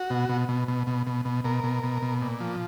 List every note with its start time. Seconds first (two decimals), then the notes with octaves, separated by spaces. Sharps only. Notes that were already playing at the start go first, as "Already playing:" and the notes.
Already playing: F#4
0.10 B2
0.29 B2
0.49 B2
0.68 B2
0.87 B2
1.07 B2
1.25 B2
1.44 B2 A#4
1.64 B2
1.84 B2
2.02 B2
2.22 A#2
2.41 F3